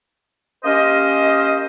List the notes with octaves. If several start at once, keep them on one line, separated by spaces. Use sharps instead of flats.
A#3 C#4 G4 C5 D#5